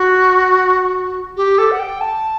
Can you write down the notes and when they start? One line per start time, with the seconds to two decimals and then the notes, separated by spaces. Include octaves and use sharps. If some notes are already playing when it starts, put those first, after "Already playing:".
Already playing: F#4
1.37 G4
1.58 A4
1.71 F#5
1.79 G5
2.01 A5